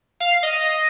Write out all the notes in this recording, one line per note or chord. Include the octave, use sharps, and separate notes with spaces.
F5
D#5